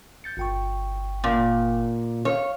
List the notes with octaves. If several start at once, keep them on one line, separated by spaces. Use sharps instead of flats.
G6 A6 C#7
G1 G5 C#6
A#2
C#5 F5 F6